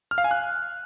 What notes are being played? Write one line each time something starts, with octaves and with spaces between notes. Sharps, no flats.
F6
F5
G#5
F#6